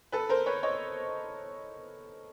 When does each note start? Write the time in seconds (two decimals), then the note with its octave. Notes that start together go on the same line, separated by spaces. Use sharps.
0.12 A4 B4
0.29 A#4 C5
0.46 B4 C#5
0.63 C#5 D#5